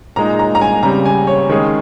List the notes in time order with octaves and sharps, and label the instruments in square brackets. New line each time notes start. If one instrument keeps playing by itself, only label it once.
[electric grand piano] A#2 G#3 D#4 [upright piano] A#5
[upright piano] A#5
A#5
G#5
[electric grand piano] C#3 G3 C4 [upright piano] A#5
[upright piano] G#5
C#5
[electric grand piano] D#3 G#3 C#4 G#4 [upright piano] C#5